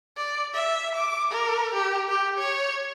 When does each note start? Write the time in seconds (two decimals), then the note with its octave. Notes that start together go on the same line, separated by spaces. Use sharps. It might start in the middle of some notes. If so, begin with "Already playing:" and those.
0.17 D5
0.54 E5
0.96 D6
1.32 A#4
1.74 G4
2.09 G4
2.38 C#5